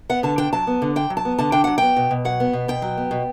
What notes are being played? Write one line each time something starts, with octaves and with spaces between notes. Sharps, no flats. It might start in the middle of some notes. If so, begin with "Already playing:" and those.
B3 F#5
D3 A5
D4 G5
F#3 A5
B3
D3
D4 G5
F#3
A5
B3
D3 A5
D4 G5
F#3 F#5
B3 G5
B2
B2
F#3 F#5
B3
B2
B2 G5
F#3
B3
B2